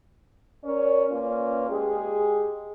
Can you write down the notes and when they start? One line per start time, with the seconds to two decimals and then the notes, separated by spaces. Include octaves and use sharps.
0.65 C#4 A#4 C#5 D5
1.12 A#3 C#4 F4 B4 D5
1.69 G#3 G4 G#4